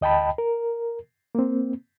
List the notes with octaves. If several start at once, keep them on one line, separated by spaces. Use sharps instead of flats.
D2 D#5 G5 A5 B5
A#4
A#3 C4